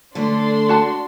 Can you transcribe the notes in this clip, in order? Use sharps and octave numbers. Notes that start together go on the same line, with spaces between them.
D3 A3 D4 C6
F#4 A5